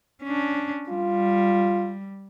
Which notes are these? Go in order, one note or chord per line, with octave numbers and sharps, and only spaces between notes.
C#4 D4
G3 F4